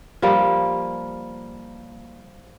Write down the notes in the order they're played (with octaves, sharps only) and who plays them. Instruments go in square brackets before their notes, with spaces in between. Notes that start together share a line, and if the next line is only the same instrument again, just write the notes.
[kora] F3 G3 A#3